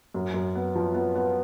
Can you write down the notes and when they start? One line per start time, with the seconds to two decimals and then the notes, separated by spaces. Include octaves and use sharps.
0.14 F#2
0.34 F#2
0.55 B3
0.75 F3
0.94 B3
1.15 B3